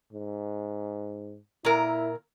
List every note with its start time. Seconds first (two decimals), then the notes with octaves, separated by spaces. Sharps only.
0.12 G#2
1.65 A#2 E4 A#4